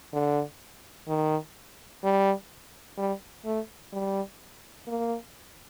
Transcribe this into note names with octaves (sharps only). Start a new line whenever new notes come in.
D3
D#3
G3
G3
A3
G3
A#3